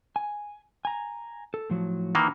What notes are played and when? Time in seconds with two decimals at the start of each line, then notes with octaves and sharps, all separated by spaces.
0.16 G#5
0.85 G#5 A#5
1.54 A4
1.70 A2 F3 F#3
2.15 D#3 E3 A#3